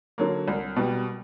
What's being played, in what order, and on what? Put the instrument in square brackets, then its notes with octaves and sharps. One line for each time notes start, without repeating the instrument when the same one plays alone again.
[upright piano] D3 F#3 A#3
C2
B2 G3